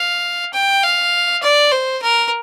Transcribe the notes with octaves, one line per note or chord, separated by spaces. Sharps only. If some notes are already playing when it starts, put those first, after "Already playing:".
Already playing: F5
G5
F5
D5
C5
A#4